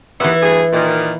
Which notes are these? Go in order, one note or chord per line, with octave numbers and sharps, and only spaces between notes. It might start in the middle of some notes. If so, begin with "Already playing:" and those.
D#2 E3 B3 E4
D2 G2 G#4
A#2 D#3